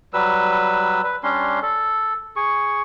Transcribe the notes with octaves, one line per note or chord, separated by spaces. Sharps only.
F#3 G3 B4 E6
B4
G3 C#4 D4 C6
A4
G#4 C#6